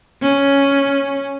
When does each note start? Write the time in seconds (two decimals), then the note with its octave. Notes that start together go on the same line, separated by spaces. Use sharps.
0.22 C#4